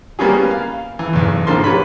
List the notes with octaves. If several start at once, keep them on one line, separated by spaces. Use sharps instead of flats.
G3 A#3 B3 C#4 G4 G#4
F5
E3
B1 E2
C#2 G#2 D3 F3 A#3 C6
G4 B4 C#5 B5